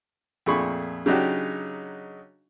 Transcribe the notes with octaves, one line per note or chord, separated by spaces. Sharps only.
F2 A#2 A3 G#4 B5 C#6
C#3 F#3 D4 D#4 F#4 G4